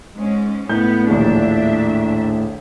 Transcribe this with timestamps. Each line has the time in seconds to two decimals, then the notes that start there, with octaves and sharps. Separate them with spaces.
0.14 G#2 G#3 C#4
0.69 A2 B3 G6
1.08 A#1 D#2 G#3 D4 E5